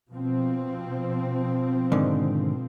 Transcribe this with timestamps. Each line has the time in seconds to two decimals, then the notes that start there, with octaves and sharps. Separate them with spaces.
0.12 B2 F3 C4
1.92 G#2 D3 D#3